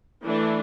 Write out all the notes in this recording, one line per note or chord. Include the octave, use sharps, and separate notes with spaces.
E3 A3 D4